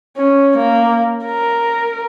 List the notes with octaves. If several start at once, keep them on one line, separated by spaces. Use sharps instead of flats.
C#4
A#3
A#4